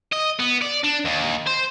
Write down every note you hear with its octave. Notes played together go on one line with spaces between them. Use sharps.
D#5
B3
D5
D4
D#2
C5